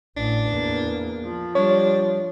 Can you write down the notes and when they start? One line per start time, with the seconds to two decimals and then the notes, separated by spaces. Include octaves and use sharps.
0.17 A1 D4
0.49 E2 A#3
1.25 F3
1.55 G3 D4 C#5